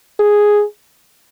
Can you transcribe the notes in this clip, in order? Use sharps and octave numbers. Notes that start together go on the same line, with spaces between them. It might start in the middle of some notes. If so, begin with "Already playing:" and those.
G#4